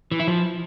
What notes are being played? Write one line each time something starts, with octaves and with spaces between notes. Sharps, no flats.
E3
E4
F3